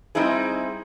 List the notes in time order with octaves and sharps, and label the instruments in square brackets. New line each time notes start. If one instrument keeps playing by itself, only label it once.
[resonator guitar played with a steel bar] G3 C4 D#4 E4 G#4